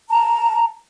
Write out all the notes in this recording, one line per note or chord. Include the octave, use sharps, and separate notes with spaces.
A5 A#5